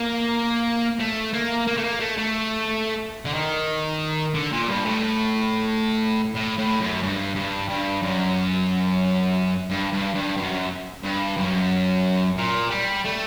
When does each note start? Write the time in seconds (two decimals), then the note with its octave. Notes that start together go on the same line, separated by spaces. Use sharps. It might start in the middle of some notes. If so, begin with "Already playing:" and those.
Already playing: A#3
1.00 A3
1.34 A#3
1.67 A#3
1.77 A3
1.84 A#3
2.00 A3
2.18 A3
3.25 D3
3.34 D#3
4.34 D3
4.52 A#2
4.68 G2
4.85 A2
6.35 A2
6.58 A2
6.80 F#2
7.03 G2
7.35 G2
7.69 G2
8.02 F#2
9.70 G2
9.92 G2
10.14 G2
10.37 F#2
11.03 G2
11.37 F#2
12.38 A#2
12.70 G3
13.05 A3